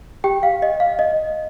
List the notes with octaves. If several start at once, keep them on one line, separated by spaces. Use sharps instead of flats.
G4 G5
F5
D#5
F5
D#5